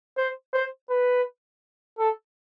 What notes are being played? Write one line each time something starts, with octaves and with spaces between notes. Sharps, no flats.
C5
C5
B4
A4